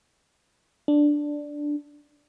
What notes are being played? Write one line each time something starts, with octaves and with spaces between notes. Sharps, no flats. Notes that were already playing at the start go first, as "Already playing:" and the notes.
D4